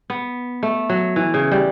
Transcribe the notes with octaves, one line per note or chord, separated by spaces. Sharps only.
B3
A3
F#3
E3
C#3
G3